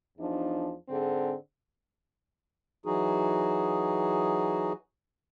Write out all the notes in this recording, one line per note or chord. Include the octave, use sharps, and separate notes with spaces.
E2 F3 D4 D#4
G#2 D3 C4 G#4
E3 F#3 D#4 F#4 G#4